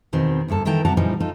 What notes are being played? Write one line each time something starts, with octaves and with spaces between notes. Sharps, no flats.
E2 B2 D#3 C4 D#4
D2 G2 A#3 A4
D#3 E3 B3 A4 G5 A#5
C3 F#3 G3 F#5 A5 A#5
A#2 C#3 E3 F3 G3 D#4
D#4 F4 A4